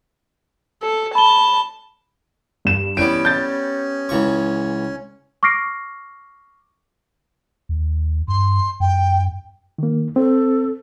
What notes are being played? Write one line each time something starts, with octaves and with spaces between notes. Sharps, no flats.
A4
A5 B5 G7
G2 E7
E3 G3 B3 C#4 D7
G6 A6
C#2 E3 C#6
C#6 D6 F6 A#6 C7 D7
D#2
G2 C6
F#2 G5
D#3 A#3
C4 A4